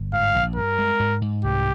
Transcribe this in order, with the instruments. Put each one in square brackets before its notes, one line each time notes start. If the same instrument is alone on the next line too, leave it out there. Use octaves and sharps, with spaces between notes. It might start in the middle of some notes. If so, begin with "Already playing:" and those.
Already playing: [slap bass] G1
[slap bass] G#2 [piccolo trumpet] F5
[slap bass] A#1
[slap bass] G2 [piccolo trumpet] A#4
[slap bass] G#3
G#2
G#2
[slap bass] C2 [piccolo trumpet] G4